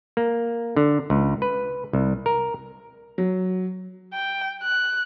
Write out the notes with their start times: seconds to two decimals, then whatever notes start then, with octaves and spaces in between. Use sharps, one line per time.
0.17 A#3
0.76 D3
1.10 C#2
1.42 B4
1.93 C2
2.26 A#4
3.18 F#3
4.13 G5
4.63 F#6